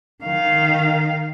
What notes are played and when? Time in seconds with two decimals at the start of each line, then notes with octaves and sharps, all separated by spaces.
0.24 D#3 F5